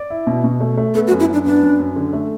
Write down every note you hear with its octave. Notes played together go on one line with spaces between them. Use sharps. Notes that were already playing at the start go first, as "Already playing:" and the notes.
Already playing: D5
E4
B2
B2
A3
A3
B3 A4
F#4
F#2
E4
F#2 D4
B3 D4
F#2
F#2
D3
A3